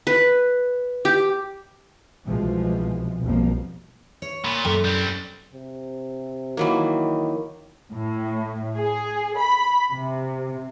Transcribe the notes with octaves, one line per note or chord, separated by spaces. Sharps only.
B4
G4
C2 B2 E3 F3 G#3
B1 F2 B2 F3 G3 A#3
C#5
A#2 B5
F#2 A4 G5
G3 C4
C3
D#3 E3 F#3 A#3
A2
G#4
B5
C3